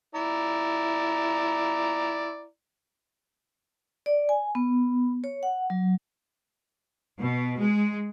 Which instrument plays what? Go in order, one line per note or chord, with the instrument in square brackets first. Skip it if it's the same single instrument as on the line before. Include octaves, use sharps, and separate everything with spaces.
[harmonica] E4 D5 A#5
[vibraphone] D5
G#5
B3
C#5
F#5
F#3
[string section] B2
G#3